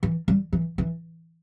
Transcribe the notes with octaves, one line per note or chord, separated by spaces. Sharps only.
E3
G3
E3
E3